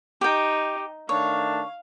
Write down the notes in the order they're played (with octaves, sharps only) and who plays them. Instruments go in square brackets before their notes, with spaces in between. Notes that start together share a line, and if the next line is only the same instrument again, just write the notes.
[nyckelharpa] D#4 [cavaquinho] G4 G5
[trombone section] D#3 A3 D4 [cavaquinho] C#5 [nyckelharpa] F5